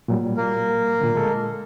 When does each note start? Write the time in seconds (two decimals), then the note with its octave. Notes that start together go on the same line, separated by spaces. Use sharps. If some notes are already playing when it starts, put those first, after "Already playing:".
0.08 A#2 F#3 G3
0.37 A#3 A#4
1.00 A#2 D3
1.16 G#3 A4